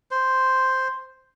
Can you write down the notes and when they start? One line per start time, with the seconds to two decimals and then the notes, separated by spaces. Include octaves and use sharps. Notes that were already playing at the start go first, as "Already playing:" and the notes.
0.11 C5